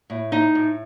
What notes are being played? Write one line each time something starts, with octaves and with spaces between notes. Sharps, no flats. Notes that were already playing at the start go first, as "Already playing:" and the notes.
A2
D#4
A2